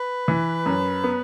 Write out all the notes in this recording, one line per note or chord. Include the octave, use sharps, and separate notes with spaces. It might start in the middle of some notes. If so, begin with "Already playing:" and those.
Already playing: B4
E3
F#2
B3